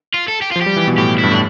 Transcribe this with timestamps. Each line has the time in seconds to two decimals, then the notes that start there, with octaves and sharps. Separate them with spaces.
0.14 F4
0.28 A4
0.42 G4
0.52 F3 F4
0.61 G4
0.66 G3
0.76 E3
0.87 B2
0.98 A2 G4
1.18 E4
1.23 G2
1.31 A2 D4